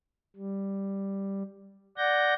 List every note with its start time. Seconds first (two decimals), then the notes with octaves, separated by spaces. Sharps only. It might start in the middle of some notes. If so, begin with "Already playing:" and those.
0.36 G3
1.98 D5 F#5 G6 A#6